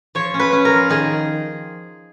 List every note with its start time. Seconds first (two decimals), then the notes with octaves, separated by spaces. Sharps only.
0.15 F3 C#5
0.34 C#4
0.39 B4
0.53 C#4
0.65 A#4
0.72 F3
0.90 D#3 G#4